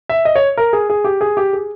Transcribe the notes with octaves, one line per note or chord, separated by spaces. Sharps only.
E5
D#5
C#5
A#4
G#4
G#4
G4
G#4
G4
G#4